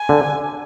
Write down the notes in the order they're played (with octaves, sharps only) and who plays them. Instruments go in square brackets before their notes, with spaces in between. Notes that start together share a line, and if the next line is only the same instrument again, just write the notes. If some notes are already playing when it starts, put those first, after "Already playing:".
Already playing: [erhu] G#5
[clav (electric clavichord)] D3